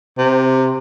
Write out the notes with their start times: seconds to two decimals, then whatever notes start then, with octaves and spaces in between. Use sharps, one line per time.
0.18 C3